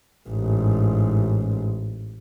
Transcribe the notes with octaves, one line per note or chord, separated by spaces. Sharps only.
A1 G#2